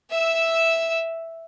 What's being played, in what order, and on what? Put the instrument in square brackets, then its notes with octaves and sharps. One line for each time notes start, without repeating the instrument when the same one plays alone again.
[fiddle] E5 E6